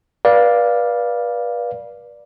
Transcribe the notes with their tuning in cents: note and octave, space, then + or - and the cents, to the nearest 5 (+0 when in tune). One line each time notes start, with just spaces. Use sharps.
B4 -35 D5 +0 F5 +0